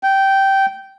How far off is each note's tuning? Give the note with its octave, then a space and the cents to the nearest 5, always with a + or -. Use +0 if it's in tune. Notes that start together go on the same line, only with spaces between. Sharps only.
G5 -10